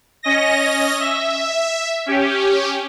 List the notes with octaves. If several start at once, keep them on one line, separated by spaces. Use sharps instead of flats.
C#4 D#5 A#6
E5
C#4 G4